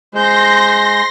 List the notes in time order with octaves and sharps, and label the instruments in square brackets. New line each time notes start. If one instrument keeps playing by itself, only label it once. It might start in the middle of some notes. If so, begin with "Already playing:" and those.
[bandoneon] G#3 [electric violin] C5 G6 [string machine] C6 A#6